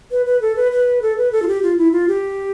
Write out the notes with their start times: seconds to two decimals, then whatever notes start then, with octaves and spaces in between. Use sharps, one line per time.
0.11 B4
0.26 B4
0.41 A4
0.56 B4
0.72 B4
1.02 A4
1.17 B4
1.32 A4
1.42 F4
1.48 G4
1.63 F4
1.78 E4
1.92 F4
2.08 G4